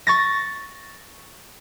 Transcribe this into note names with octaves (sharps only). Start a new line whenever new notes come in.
C#6 A6 A#6